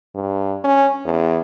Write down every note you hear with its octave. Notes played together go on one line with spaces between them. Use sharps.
G2
C#4
E2